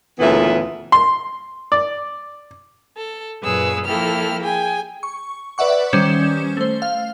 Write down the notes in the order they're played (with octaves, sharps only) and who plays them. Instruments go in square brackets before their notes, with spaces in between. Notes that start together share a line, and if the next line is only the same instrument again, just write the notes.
[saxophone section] D2 A#2 C#3 E3 B3 E5
[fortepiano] C6
D5
[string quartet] A4
F#2 A#2 G#4 B4 C#5 E6
F3 A#3 E4 A4 G5 F6
G#4 G5 G#5
[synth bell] C#6
B4 D5 E5 F#5 C#6
D#3 G3 C#4 C5 E7
A3 C5
F5